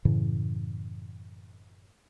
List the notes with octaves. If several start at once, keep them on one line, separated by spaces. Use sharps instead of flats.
F#2 A2 C#3 E3